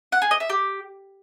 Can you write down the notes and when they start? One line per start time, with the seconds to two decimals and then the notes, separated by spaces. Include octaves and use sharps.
0.12 F#5
0.22 G#4
0.31 D#5
0.40 E5
0.50 G4